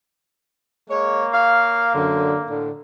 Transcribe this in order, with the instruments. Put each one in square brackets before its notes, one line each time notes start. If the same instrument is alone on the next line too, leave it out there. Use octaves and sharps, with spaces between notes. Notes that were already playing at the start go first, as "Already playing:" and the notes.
[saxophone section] G#3 C#5 [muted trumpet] A#3
[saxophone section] C#5 F5
F#2 D3
A2 D3